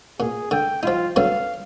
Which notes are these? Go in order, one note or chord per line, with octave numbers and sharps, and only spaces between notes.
A#2 G#4
D3 G5
F3 D#4 F4
D3 F#3 B3 F5